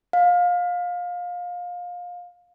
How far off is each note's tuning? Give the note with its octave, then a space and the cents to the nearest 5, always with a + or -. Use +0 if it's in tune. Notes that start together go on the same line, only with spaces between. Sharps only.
F5 +25